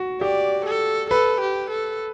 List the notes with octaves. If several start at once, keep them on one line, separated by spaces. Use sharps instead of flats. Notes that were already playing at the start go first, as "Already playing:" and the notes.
Already playing: F#4
G4 D5
A4
A4 B4
G4
A4